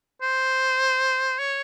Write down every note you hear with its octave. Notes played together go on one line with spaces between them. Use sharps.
C5
C#5